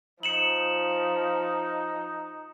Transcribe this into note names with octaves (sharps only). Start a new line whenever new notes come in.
F3 D#4 C#7 E7 F#7